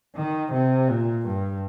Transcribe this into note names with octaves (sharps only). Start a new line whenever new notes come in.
D#3
C3
A#2
G2